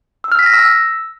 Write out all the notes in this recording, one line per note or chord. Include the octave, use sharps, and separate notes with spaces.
E6
F6
B6
A#6
E6